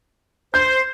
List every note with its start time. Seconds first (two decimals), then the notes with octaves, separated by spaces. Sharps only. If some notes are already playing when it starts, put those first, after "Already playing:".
0.54 C5 G6